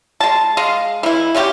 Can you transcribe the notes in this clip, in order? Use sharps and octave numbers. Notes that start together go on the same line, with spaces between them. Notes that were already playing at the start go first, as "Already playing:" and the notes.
G#3 A5
G#3 D#5 F5
E3 E4
C#3 C#4 F4 G4